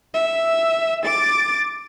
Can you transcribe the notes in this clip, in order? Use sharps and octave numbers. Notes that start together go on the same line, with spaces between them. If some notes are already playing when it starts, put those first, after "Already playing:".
E5
D6 A6